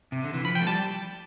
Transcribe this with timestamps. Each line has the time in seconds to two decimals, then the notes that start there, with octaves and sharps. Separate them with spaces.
0.12 C3
0.23 D3
0.34 E3
0.44 F3 B5
0.55 G5
0.61 A3
0.67 G3 A5